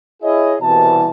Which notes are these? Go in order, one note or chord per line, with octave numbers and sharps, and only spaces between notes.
E4 G#4 C#5 D#5
C2 B2 E3 A5